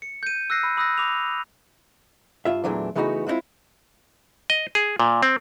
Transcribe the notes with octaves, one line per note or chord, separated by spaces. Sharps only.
C#7
G6 D#7
E6 F#6 A#6 C7
B5
B5 D#6 E6 F#6 A#6
B5 D6 F7
G2 F4 E5
E2 A#2 E3 F#3 A3 D4
C#3 E3 A3 B3 D#4 F#4
G#3 C4 D4 E4 F4
D#5
G#4
A#2
C4